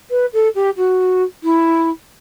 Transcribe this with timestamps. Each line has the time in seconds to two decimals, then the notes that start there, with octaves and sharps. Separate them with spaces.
0.10 B4
0.33 A4
0.55 G4
0.76 F#4
1.43 E4